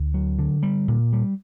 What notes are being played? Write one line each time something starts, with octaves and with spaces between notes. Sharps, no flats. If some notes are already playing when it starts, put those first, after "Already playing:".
Already playing: D2
F#3
D3
G3
A#2
G3